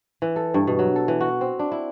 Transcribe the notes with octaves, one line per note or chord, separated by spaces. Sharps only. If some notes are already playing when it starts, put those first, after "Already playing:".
E3
A4
G2
B2
F#3
A4
E3
F#4
C4
D4
E4